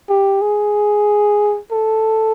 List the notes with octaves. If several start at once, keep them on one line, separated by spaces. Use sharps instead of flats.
G4
G#4
A4